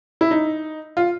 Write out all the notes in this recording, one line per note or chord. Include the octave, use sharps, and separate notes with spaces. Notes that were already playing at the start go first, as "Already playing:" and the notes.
E4
D#4
F4